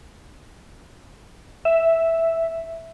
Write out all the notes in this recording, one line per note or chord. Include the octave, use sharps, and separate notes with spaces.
E5